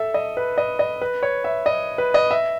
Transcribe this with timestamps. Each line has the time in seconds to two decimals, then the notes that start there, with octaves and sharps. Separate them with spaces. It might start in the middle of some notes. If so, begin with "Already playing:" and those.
Already playing: A4 E5
0.14 D#5
0.37 B4
0.58 D#5
0.79 D#5
1.01 B4
1.23 C#5
1.44 E5
1.66 D#5
1.98 B4
2.14 D#5
2.31 E5